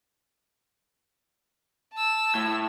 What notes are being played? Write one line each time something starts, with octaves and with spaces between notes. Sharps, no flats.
A5 E6
A2